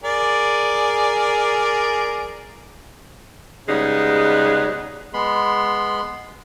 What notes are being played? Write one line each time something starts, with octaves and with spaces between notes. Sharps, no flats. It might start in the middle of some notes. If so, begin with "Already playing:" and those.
G#4 A#4 D5
C#3 G3 G#3 B3 D#4
G#3 B3 B5 C6